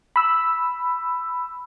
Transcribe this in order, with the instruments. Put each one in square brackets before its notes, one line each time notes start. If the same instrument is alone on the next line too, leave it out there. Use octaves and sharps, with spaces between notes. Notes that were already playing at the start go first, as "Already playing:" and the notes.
[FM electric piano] B5 E6